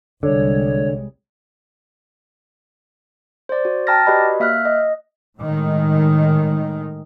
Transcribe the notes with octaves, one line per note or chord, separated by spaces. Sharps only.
C2 D3 G3 G#3 C#5
C5 D5
F#4
G5 A5 A#5 F6 A6 A#6
F#4 G4 B4 D5 D#5 B5
A#3 E5 F6 F#6
D#5
A2 D#3 G#3